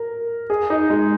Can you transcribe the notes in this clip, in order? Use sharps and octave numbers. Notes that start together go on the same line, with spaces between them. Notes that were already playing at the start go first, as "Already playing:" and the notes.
Already playing: A#4
G#4
D#4
G#3